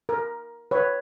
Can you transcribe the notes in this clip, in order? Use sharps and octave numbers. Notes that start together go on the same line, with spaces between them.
A#4
B4 C#5